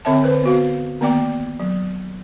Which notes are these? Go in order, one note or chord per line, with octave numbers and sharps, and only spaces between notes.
D3 C4 C#5 E5 A5
D3 B4 C5
B3 F#4 F5
D#3 A#3 B3 D5 G5 D6
F#3